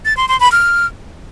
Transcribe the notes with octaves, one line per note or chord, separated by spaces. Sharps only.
A6
C6
C6
B5
F6